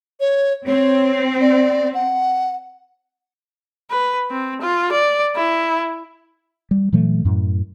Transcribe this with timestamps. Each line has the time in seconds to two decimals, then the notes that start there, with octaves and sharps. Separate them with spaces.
0.20 C#5
0.67 C4 C#5
1.41 D5
1.94 F#5
3.91 B4
4.31 C4
4.61 F4
4.92 D5
5.36 E4
6.71 G3
6.93 A#2 E3 F#3 A3
7.25 F#2 A2